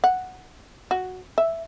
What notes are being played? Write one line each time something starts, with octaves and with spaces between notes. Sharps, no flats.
F#5
F#4
E5